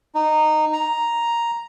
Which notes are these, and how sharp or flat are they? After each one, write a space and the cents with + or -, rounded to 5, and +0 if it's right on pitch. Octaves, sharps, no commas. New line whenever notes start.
D#4 -15
A#5 +5